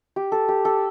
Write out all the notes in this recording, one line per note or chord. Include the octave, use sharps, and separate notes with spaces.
G4
A4
G4
A4